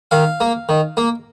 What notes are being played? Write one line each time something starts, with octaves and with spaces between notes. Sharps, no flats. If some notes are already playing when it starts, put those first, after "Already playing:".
D#3 F5
A#3
D#3
A#3